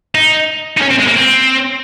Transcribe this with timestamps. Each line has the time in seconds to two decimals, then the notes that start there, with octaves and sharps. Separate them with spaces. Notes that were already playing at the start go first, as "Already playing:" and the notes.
0.15 D#4
0.78 D#4
0.82 C#4
0.91 C4
0.99 G#3
1.08 A#3
1.16 C4